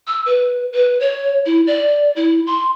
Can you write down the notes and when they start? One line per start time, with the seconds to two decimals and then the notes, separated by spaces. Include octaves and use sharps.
0.07 E6
0.26 B4
0.73 B4
1.00 C#5
1.46 E4
1.67 D5
2.16 E4
2.47 C6